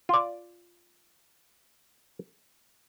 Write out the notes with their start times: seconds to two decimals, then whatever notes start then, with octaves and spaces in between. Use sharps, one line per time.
0.09 F4 D5